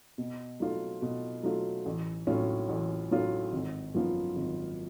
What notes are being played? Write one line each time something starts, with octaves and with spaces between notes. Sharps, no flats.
B2
F#3 A3 F4
B2
F#3 A3 F4
A1
A2 F#3 C#4 F4
A1
A2 F#3 C#4 F4
G#1
F#2 F3 B3 F4
G#1